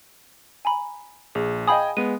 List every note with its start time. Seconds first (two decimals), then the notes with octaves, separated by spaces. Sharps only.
0.65 G#5 A#5 B5
1.35 A#1 G#4
1.68 D#5 F5 G5 G#5 B5 D#6
1.97 G#3 B3 D#7